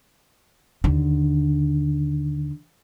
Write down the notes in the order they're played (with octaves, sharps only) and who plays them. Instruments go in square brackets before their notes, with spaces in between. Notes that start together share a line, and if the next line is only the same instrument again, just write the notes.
[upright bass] D#2 D3